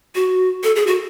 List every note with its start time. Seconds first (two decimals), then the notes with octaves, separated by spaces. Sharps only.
0.15 F#4
0.63 A4
0.76 G#4
0.87 F#4